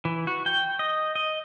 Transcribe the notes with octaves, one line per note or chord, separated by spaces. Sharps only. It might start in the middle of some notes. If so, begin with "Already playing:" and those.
E3
F#4
G5
D#5
D#5